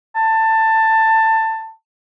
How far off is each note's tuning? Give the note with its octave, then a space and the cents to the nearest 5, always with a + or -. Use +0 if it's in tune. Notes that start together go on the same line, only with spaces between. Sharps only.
A5 +15